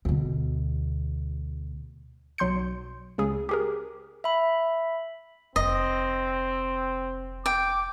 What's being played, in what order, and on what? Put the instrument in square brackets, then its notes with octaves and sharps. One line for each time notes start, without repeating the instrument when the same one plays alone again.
[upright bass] D2 B2
[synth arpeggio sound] B1 F#3 C6 G6 C#7
C#2 C#3 G#4
G4 G#4 A#4
[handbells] E5 B5
[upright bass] F1 D3 [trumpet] C4 [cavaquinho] D#5
[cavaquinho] G5 [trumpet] D6